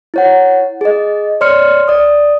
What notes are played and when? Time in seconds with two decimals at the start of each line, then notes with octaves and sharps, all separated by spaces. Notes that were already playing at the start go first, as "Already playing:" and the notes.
0.14 E4 C#5 F#5
0.81 G#4 D#5
1.41 C#5 D5 C6 F6 C#7
1.88 D5 D#6